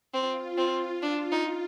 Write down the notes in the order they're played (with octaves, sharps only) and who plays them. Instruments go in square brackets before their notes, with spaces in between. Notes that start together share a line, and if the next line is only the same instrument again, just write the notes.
[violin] C4 [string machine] F4
[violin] C4
D4
D#4